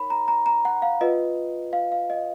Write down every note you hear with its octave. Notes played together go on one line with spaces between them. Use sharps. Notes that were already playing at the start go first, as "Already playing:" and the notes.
Already playing: D#4 A#4 C#5 B5
A#5
A#5
A#5
F#5
F5
F4 B4 D#5
F5
F5
D#5